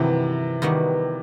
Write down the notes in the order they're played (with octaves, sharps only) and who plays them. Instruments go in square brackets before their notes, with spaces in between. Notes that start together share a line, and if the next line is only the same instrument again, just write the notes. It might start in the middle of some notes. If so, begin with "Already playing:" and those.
Already playing: [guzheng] G2 D#3 F#3 B3 D#4 [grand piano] C3 E3
[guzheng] D#3 G3 B3 D#4 F#4